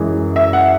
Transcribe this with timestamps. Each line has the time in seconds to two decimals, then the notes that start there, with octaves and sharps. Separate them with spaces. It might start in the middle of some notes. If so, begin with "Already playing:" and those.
Already playing: F#2 E3 G#3
0.36 E5
0.53 F#5